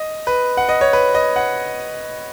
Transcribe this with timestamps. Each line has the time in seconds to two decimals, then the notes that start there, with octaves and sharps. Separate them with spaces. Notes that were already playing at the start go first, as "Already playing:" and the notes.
Already playing: D#5
0.27 B4
0.57 F#5
0.69 D#5
0.81 C#5
0.93 B4
1.15 D#5
1.36 F#5